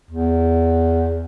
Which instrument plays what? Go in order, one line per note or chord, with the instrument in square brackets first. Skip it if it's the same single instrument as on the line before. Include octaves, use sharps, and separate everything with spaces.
[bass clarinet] E2